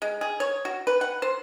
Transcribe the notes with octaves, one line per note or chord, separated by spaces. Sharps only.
G#3
G#4
C#5
F#4
B4
F#5
C5